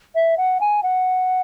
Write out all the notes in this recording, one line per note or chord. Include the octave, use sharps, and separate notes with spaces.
E5
F#5
G#5
F#5